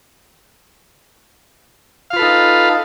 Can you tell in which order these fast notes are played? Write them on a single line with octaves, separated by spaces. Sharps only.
F5 F4 B4 A4 D#4